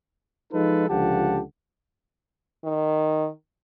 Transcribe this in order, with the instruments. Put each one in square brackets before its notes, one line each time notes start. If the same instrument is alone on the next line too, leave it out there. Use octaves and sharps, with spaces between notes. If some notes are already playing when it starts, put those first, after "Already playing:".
[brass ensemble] F3 G#3 D#4 F4 A4 B4
C#2 D3 F3 G4 F#5 A5
[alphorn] D#3